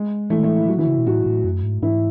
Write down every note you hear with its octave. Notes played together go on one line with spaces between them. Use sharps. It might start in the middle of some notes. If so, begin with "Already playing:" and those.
Already playing: G#3
A2 E3 A3
D#3
A2 E3 A3
E4
E3
F#3 F#4
D#3 E3 E4
C#3
B2
A2 F#3 F#4
A2
F#2
G#2
G#2 E3 E4